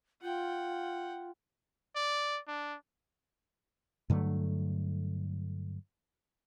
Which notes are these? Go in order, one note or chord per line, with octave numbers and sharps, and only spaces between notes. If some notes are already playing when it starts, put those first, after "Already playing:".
F4 F#5 G5
D5
D4
G2 D3 F#3 A3